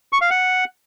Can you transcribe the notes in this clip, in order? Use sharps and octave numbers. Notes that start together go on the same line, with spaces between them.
C#6
F5
F#5